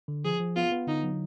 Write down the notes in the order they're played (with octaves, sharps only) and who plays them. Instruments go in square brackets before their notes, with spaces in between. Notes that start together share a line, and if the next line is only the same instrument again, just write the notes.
[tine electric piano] D3
[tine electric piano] F3 [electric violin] G#4
[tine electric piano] F3
[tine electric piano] B3 [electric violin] F4
[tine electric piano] B3
[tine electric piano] D3 [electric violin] D#4
[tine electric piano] F#3